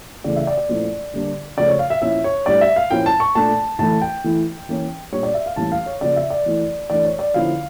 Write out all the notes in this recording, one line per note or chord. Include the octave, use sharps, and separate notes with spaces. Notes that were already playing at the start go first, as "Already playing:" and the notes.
C#3 E3 A3 D5
E5
D5
D5
A#2 F3 A3 C#4 E4
D3 G3 A#3 D4
C#3 F3 A3 D5
C#5
F5
E5
A#2 F3 C#4 E4 E5
C#5
A2 G3 D4 D5
E5
F5
A#2 F3 A#3 C#4 E4 G5
A5
C#6
A#2 A3 D4 A5
A2 E3 A3 E4 A5
G5
E3 A3 E4
E3 A#3 C#4
A#2 G3 D4 C#5
D5
E5
F5
A2 E3 G3 A#3 C#4 A5
F5
C#5
C#3 F3 A#3 D5
E5
D5
E3 A3 E4
E3 A3 D4 D5
C#5
D5
D3 F3 A#3 C#4 E4 F5